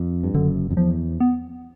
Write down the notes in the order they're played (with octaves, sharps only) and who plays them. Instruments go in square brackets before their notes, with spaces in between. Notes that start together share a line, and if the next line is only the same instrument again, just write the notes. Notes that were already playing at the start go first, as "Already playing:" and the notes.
Already playing: [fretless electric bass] F2
G2
[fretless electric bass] F#1 F#2 [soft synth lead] D3
[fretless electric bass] F2
[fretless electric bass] E2 [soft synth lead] F3
[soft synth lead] B3